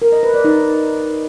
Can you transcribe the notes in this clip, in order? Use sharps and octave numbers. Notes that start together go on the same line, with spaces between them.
A#4
D#5
B4
D5
D#4